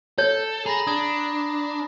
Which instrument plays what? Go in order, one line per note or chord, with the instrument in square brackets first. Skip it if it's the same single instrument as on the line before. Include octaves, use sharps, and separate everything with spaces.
[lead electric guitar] A4 [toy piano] C#5 [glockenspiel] G#6
[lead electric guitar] G#4 [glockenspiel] A#5 B5 A#6
[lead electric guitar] D4 [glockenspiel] D#6 G#6